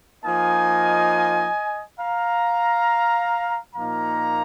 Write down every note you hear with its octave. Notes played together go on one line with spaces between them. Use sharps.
F3 A#3 D#4 D#5 G#5
F5 A#5
A#2 F3 A#3 D#4 F5 A#5